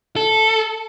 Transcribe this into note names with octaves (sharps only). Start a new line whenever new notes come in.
A4